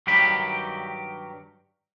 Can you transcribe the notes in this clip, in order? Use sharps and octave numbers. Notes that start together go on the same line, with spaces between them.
G2 D#3 F#3 G4 B5